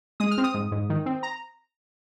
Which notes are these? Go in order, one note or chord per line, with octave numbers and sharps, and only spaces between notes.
G#3 D#6
F6
C4
D#6
G#2
G#2
D#3
C4
A#5